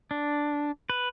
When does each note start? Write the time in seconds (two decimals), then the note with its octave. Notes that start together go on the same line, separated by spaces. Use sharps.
0.11 D4
0.90 B4